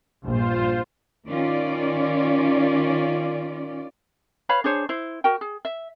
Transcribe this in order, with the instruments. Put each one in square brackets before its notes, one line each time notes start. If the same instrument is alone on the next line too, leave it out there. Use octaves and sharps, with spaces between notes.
[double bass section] A#1 G2 [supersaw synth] F4 C5
[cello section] D#3 C#4 F4 D5
[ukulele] B4 C#5 F5 B5
D4 G#4 C5 C#5
E4 C5
F#4 A#4 G5
G#4
E5